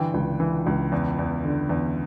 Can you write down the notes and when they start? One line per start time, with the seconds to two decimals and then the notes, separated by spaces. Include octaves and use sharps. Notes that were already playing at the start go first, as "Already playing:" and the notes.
Already playing: G2 D3 E3 G5
0.14 C#2
0.40 E3
0.67 C#2
0.92 E2
1.19 E2
1.44 D3
1.69 E2